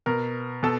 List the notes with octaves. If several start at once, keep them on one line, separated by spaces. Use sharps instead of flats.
B2 A#4
B2 A4